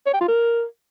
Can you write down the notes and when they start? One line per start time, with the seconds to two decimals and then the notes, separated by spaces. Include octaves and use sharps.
0.06 C#5
0.14 G5
0.21 F4
0.28 A#4